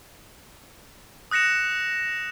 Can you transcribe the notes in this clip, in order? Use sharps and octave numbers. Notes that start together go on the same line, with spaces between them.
D#6 F#6 A#6 C#7 E7